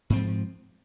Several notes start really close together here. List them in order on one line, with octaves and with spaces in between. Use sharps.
G#2 C4 F3